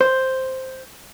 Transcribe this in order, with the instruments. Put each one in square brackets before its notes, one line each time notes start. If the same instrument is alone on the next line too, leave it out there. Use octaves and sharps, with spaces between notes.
[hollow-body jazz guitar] C5